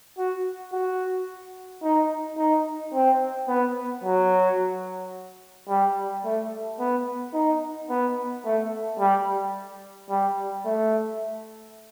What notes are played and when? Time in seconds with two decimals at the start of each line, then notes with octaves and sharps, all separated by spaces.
0.18 F#4
0.73 F#4
1.83 D#4
2.38 D#4
2.94 C4
3.48 B3
4.04 F#3
5.68 G3
6.25 A3
6.80 B3
7.34 D#4
7.90 B3
8.45 A3
8.99 G3
10.10 G3
10.65 A3